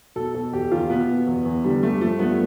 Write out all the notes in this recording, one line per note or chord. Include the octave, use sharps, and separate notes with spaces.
B2 A4
B2 A4
E2 G4
E2 F4
B2 B3
B2
E2
E2
D3 G3
G2 A3
F3 A3
G2 B3